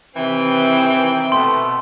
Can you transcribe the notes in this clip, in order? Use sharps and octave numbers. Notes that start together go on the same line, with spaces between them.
C3 D#3 E3 C4 G5
B2 A3 C6